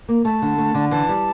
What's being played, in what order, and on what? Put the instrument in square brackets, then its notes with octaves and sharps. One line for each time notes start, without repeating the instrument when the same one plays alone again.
[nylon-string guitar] A#3
[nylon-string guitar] A3 [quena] A5
[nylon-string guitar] D3
A3
D3
[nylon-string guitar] E3 [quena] A5
[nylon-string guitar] G3